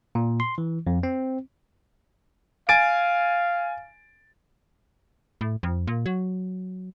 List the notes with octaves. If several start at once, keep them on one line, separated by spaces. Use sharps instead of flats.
A#2
C6
E3
F2
C4
F5 G#5 A6 D7
A2
F2
A#2
F#3